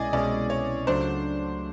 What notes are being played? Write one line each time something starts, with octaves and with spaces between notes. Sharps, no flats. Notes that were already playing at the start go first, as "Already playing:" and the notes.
Already playing: C2 B2 G#3 C#4 E4 G#4 D5 D#5
C2 B2 G#3 C#4 E4 D5
C#5
C#2 C#3 F#3 A3 D4 C5